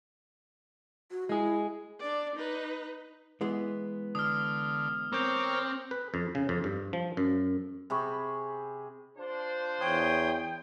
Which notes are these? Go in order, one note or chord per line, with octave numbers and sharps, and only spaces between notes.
F#4
G#3 E4 G#4
D4 D5
D#4 B4
E3 G#3 B3
D3 D#6 F6
C4 A#4 C#5 D6 F6 G6
B4
F2
C#3
F2
G2
F3
F#2
C3 G#4 B5 C#6
D4 F4 C5
E2 C#5 G5 C6 D#6